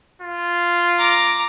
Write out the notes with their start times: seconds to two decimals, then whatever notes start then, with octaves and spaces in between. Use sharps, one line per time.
0.22 F4
0.99 A#5 D6